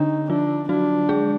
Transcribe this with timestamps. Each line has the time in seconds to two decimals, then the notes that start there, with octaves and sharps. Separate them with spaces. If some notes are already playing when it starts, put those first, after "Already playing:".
Already playing: D3 D4 D#4
0.29 F3 D4 F4
0.69 F#3 D4 F#4
1.09 G#3 G#4